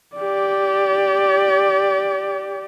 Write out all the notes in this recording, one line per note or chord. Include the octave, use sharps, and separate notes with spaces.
G4 D5